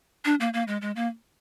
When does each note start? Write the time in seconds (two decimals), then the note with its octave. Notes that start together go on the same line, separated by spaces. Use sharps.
0.25 D4
0.40 A#3
0.54 A#3
0.68 G#3
0.82 G#3
0.96 A#3